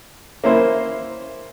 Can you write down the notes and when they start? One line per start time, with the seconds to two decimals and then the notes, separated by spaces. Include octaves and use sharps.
0.44 A#3 C#4 E4 C5